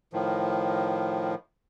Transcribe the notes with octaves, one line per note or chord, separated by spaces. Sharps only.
A2 D#3 F3